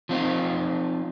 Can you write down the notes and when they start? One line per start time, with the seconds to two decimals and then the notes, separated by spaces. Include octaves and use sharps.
0.09 F3 C4 D#4 F4